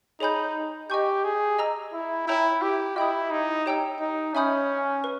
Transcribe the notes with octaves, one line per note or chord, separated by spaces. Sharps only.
D#4 G#4 C#5 G#5 B5 G6
G4 D#5 G#5 C#6 G6
G#4
D#5 A#5 E6
E4
E4 C#5 G5 A#5 E6 G6
G4
E4 D#5 G5 B5 D#6
D#4
G4 C#5 G5 A#5 E6
D#4
C#4 E5 G#5 B5 D#6 G6
B4